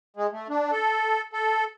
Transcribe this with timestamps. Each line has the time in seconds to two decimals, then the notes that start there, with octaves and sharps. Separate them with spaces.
0.16 G#3
0.32 A3
0.49 D4
0.72 A4
1.33 A4